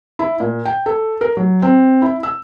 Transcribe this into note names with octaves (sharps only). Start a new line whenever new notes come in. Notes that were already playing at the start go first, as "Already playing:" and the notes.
E4
A#2
G5
A4
A#4
F#3
C4
E4
E6